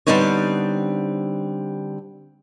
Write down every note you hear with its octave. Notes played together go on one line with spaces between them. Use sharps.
D3 G3 B3 C4 D#4 C#5